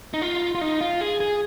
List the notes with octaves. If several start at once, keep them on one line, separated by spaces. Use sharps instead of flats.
D#4
F4
F4
D#4
F4
G#4
G#4